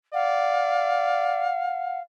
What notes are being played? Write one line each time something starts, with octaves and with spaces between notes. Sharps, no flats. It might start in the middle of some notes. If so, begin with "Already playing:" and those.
D5 F5 F#5